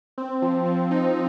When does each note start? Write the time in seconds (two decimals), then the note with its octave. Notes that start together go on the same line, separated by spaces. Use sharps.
0.18 C4
0.42 F3
0.65 F3
0.91 D#4